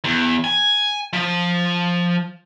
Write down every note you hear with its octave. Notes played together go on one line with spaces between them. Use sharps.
E2
G#5
F3